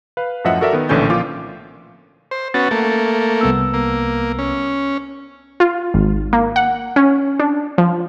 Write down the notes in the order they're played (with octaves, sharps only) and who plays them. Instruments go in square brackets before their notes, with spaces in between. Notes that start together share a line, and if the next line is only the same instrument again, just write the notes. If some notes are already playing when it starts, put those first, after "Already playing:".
[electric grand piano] B4 F5
F#2 A2 F3 D#5 E5 F#5
F#4 A4 A#4 D5 E5
D#3 B3
A#1 A2 D3 E3 C#4 G6
A#2 F3 F4 D6
[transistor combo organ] C5
[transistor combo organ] B3 C#4 F#4 [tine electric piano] A6
[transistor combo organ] A3 A#3
[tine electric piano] C2 B3 E6
[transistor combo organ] A#3
C#4
[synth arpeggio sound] F4
G#1
A#3
F#5
C#4
D4
F3